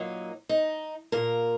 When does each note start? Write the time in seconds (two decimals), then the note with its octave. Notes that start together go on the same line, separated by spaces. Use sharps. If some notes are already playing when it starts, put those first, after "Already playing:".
Already playing: A#2 F#3 A#3 D#4
0.49 D#4
1.12 A#2 A#3 A#4